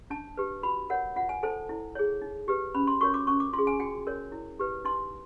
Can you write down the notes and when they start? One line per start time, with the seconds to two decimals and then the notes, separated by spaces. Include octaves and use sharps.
0.10 D4 A5
0.37 G4 B4
0.63 F#4 B5
0.90 A#4 C#5 F#5
1.16 F4 F#5
1.29 G#5
1.43 A4 C5 A5
1.69 E4
1.95 G#4 C#5
2.22 D#4
2.48 G4 B4
2.75 C#4 B5
2.87 C6
3.01 F#4 A#4 C#5 C#6
3.14 D6
3.27 C#4 C#6
3.40 D6
3.53 F4 C6
3.58 G#4
3.67 G#5
3.80 F#4 G5
4.07 A#4 C#5
4.32 E4
4.59 G4 B4
4.85 D#4 C6